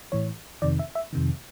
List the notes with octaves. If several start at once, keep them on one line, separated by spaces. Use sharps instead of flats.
A2 E3 C#5
F2 C3 D#3 D5
E5
E5
F2 C3 D#3